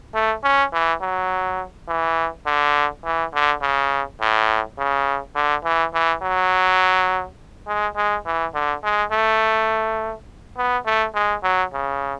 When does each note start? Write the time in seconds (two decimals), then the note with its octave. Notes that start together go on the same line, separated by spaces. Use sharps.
0.14 A3
0.43 C#4
0.73 E3
1.01 F#3
1.88 E3
2.46 D3
3.04 E3
3.34 D3
3.62 C#3
4.20 A2
4.78 C#3
5.35 D3
5.64 E3
5.93 E3
6.22 F#3
7.67 G#3
7.96 G#3
8.26 E3
8.54 D3
8.83 G#3
9.12 A3
10.57 B3
10.86 A3
11.15 G#3
11.43 F#3
11.73 C#3